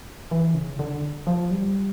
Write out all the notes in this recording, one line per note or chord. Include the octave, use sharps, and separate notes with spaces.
E3
C#3
D3
F3
G3